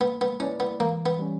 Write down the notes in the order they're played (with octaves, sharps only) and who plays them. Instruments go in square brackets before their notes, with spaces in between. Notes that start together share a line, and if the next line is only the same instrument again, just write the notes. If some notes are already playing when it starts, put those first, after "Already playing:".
[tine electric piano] A#3 [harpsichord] B3
[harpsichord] B3
[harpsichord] C#4 [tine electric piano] E4 B4 D5
[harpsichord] B3
[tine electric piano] E3 [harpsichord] A#3
[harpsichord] B3
[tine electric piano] G3 C#4